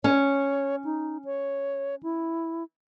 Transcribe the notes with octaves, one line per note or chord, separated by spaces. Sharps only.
C#4 C#5
D#4
C#5
E4